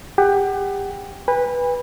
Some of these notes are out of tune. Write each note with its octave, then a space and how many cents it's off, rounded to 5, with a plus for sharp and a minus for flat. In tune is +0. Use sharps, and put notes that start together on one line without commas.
G4 +30 F#5 +30
B4 -10 G#5 -45